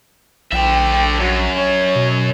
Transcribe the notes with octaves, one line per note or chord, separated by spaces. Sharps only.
A#1 D3 E5 G5
F#2 F#4
C#5
B2